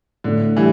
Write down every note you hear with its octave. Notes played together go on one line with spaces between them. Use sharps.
A2 D3
E3 G3